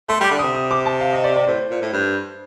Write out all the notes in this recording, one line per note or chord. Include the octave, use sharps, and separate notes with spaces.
A3 C6
G3 D6
D3
C3 D#6
D#6
D6
A5
F5
D#5
D5
D5
A2 C5
A#2
A2
G2